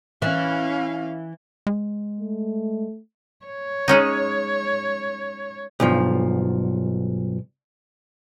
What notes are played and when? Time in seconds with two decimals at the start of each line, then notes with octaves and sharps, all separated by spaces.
0.22 E3 C#4 F5
1.67 G#3
2.20 A3
3.46 C#5
3.88 G#3 C#4 D#4
5.80 B1 G2 F3